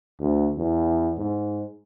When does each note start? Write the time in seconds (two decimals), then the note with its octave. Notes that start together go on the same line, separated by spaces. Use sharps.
0.19 D2
0.58 E2
1.18 G#2